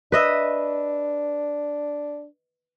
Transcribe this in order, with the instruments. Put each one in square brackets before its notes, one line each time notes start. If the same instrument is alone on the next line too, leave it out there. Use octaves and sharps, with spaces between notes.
[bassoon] D4 [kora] B4 D#5 E5